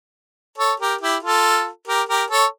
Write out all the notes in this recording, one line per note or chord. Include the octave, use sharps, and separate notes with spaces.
A4 C#5
G4 A#4
E4 G4
F4 A4
G4 A#4
G4 A#4
A4 C#5